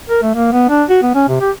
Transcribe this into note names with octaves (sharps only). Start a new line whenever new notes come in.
A#4
A3
A#3
B3
D4
F#4
B3
C#4
C3
G4